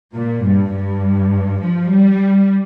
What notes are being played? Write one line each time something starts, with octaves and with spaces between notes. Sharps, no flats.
A#2
G2
G2
F3
G3